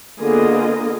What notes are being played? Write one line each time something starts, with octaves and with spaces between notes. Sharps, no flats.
D3 A#3 B3 F4 G#4 D#5